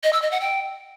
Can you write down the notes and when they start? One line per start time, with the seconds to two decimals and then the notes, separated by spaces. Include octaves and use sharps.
0.04 D#5
0.13 E6
0.22 D#5
0.31 F#5
0.41 G5